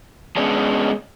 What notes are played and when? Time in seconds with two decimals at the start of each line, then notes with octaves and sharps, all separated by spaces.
0.36 G#3 B3 C#4 D4